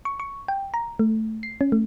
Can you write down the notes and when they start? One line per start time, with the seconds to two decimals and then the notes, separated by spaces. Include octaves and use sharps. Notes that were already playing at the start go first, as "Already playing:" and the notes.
0.05 C#6
0.20 C#6
0.48 G5
0.74 A#5
0.99 A3
1.43 C7
1.61 C#4
1.72 A3